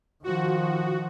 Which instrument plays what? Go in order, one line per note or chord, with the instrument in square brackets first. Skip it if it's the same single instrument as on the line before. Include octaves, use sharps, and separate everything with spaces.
[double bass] D#3 F3 [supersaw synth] F#4